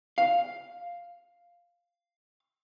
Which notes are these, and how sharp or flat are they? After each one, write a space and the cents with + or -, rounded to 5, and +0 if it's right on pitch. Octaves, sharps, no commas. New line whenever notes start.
F5 +0